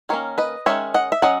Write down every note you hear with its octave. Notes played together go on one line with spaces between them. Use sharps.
D#3 A#3 C#4 A#4 C#5
B4 D#5
D#3 G#3 C#4 C#5 E5
D#5 F#5
E5
F#3 C#4 D#5 F#5